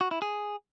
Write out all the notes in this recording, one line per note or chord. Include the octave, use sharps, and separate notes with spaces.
F#4
E4
G#4